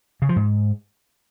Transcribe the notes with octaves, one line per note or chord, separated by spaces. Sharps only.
C#3
F3
G#2